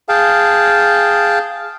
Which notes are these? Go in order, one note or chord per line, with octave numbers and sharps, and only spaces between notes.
G#4 F5 G5 A5